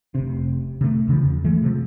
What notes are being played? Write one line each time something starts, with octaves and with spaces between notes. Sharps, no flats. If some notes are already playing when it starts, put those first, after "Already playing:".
F1 C3
C3 A3
E2 C#3 E3 F3
E3 G#3 A3
C3 F3